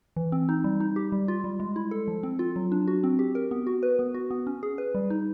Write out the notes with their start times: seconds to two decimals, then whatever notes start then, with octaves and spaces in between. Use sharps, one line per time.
0.16 E3
0.32 C4
0.49 D#4
0.64 G3
0.80 D#4
0.96 G4
1.12 G3
1.28 F4
1.44 G3
1.60 G#3
1.76 E4
1.91 A4
2.08 F3
2.23 C4
2.39 F4
2.56 F#3
2.72 D4
2.88 F#4
3.04 C4
3.19 G4
3.35 A#4
3.51 B3
3.67 F#4
3.83 B4
3.99 B3
4.14 F#4
4.31 B3
4.47 C#4
4.63 G#4
4.78 B4
4.95 G3
5.10 D#4